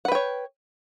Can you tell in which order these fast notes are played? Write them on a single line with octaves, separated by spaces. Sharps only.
F#5 B4 G5 C#5